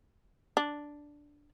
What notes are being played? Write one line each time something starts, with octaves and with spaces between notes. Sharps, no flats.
D4